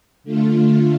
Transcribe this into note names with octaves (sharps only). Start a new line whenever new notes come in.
D3 A3 F4